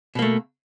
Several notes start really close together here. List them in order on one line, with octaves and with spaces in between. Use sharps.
B2 A#3 A3